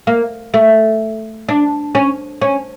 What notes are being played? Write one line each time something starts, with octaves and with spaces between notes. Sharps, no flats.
A#3
A3
D4
C#4
C#4